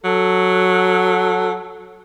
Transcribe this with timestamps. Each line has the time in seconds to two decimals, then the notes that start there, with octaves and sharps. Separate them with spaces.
0.04 F#3 A4